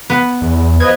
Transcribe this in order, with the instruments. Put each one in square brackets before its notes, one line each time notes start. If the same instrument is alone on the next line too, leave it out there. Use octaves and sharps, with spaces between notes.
[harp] B3
[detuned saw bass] E2
[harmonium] F3 B4 D#5 [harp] G#6